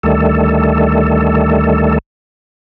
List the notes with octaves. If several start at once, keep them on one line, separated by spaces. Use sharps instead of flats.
D2 D#3 G3 A3 A4